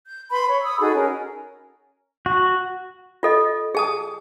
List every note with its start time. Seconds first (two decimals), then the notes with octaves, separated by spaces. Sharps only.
0.06 G6
0.30 B4 B5 C6
0.47 C#5
0.63 B5 D#6 E6
0.80 D#4 F#4 G#4 A4
0.95 C#4 A#4
2.26 F#4
3.23 F4 A4 D#5
3.75 G#4 A5 D#6